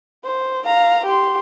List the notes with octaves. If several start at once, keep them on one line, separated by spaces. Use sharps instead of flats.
C5
F5 A#5
G4 C6